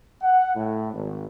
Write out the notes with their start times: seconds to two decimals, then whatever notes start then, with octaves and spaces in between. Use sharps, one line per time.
0.22 F#5
0.55 A2
0.93 G#1